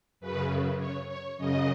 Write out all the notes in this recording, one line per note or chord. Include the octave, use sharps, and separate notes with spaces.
F#2 C#3 B4
C#5
C#5
F#2 C#3 D#5